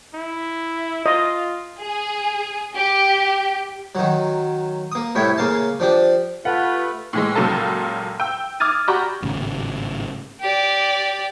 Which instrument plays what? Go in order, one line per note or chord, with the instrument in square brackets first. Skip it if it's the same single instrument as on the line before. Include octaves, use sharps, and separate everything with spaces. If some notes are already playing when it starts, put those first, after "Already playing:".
[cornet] E4
[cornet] F4 [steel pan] D#5
[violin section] G#4
G4
[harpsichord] D#3 F#3
A#3 D#6
C2 A2 E4 C#5 G5
C#3 A#3 F5 A5
F3 D4 G4
[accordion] A3 B4 [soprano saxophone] F4 [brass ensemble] G4 A4 [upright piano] F#5
[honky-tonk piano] A2 E3 G#3
C#2 A#2 C#3 F#3 A4 A5
G5 E6
D6 D#6 F6 G#6 A6 D#7
F#4 G4 D5 A#5 B5 C#6
[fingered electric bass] G#1 A2 C#3
[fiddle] G4 D5